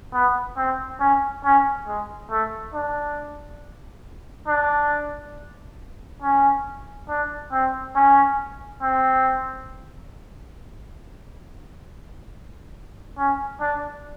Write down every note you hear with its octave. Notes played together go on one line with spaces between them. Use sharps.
B3
C4
C#4
C#4
G#3
A3
D4
D4
C#4
D4
C4
C#4
C4
C#4
D4